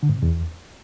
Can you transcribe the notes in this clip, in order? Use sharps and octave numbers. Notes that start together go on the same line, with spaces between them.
D3
G#2
C3
E2